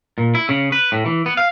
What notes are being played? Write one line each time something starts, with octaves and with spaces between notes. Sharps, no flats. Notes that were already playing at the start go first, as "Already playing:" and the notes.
A#2
E4
C#3
B4
A2
E3
B3
F5